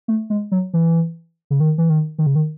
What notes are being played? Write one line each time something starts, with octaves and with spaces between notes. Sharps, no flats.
A3
G#3
F#3
E3
C#3
D#3
E3
D#3
D#3
C#3
D#3